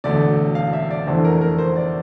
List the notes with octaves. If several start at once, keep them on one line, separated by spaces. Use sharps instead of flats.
E1 D2 D3 A3 D5
F5
E5
D5
F1 E2 E3 A3 D4 C5
A#4
A#4
C5
D5